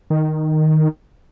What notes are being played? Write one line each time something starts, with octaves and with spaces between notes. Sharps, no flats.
D#3